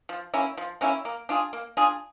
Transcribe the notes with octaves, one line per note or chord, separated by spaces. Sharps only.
F3
A#3 C#4 E4
F3
A#3 C#4 E4
A#3
D4 F4 G#4
A#3
D4 F4 G#4